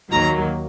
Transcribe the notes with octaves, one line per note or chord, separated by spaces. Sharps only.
D#2 D#3 F#3 A#3 A#5